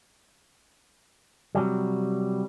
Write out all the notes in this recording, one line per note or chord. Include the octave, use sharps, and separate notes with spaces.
C3 F#3 G3